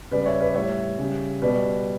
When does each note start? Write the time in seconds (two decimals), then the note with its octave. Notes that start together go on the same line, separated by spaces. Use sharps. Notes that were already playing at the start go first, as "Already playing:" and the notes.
0.11 C#3 G3 B4 D5
0.26 C#5 E5
0.41 B4 D5
0.54 A2 G3 C#5 E5
0.98 C#3 G3
1.42 B2 G3 B4 D5